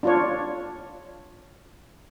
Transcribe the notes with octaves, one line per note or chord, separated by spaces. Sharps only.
D4 F4 C#5